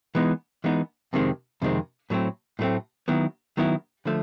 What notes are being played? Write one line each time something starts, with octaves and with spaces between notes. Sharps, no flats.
E3 G#3 B3 D#4
E3 G#3 B3 D#4
F2 C3 D#3 G#3 C4
F2 C3 D#3 G#3 C4
A2 F#3 A3 C4
A2 F#3 A3 C4
D#3 F#3 B3 E4
D#3 F#3 B3 E4
D3 F3 A3